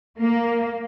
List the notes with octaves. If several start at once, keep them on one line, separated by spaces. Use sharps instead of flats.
A#3